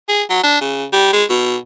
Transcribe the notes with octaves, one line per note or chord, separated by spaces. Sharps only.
G#4
F#3
D4
C#3
G3
G#3
B2